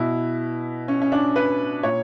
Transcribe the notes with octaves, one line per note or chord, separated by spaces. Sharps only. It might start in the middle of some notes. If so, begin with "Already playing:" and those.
Already playing: B2 E4
C#4
C#4
D4
B4
A#2 C#5